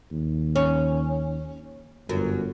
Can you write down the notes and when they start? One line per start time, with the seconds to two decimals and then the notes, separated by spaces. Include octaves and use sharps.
0.12 D#2
0.56 C#4
2.09 G1 F#2